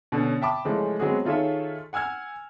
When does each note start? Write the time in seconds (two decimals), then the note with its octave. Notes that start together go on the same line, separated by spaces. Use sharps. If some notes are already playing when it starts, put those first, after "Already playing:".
0.12 B2 D3 C#4
0.42 E5 G5 A5 B5 D6
0.65 C#3 E3 F3 G#3 A3 C#4
0.99 F#3 G#3 B3 C4 F#4 G#4
1.25 D#3 F4 G#4 A4 C#5 E5
1.93 F#5 G#5 E6 F6 G#6